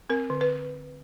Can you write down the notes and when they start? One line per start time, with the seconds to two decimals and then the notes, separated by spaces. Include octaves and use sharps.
0.10 C4 A#4
0.30 D3
0.41 B4